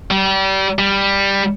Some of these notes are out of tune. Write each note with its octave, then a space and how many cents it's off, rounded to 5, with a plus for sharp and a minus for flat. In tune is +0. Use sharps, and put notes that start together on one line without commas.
G3 -25
G3 +10